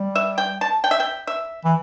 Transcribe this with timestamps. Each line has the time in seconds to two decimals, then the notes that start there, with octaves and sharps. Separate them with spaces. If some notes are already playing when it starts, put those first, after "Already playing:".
Already playing: G3
0.16 E5
0.38 G5
0.61 A5
0.84 G5
0.91 E5
1.00 G5
1.27 E5
1.64 E3